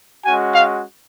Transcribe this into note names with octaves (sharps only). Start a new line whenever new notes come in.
G#3 C#4 F#4 G#5
F5